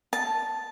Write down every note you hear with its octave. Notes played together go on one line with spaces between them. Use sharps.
A5